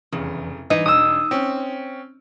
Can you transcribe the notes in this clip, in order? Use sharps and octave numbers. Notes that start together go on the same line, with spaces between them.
F1 E2 C#3
E3 D#4
E1 D#6 E6
C4 C#4